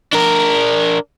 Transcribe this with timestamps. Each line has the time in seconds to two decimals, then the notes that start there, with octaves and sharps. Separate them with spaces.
0.13 D4 A#4